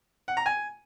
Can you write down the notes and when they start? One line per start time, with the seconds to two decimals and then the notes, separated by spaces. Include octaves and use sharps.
0.28 F#5
0.37 A#5
0.46 G#5